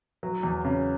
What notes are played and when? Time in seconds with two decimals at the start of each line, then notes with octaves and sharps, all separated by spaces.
0.23 F#3
0.43 E2
0.65 C#3